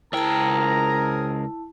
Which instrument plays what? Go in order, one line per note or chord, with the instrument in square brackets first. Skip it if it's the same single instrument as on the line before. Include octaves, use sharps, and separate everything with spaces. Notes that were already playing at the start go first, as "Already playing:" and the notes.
[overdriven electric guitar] C#2 G5 [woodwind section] C4 G#4 A#4 [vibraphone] E4 A5 [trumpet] A#5